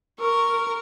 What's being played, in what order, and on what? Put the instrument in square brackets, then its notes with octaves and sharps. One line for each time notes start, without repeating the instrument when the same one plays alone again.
[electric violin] A#4 [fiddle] C#6